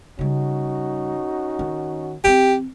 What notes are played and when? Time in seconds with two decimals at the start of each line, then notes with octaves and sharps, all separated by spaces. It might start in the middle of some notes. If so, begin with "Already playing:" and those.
0.19 C#3 G3 C#4 D#4 F#4
1.59 D#3
2.24 E3 C4 G4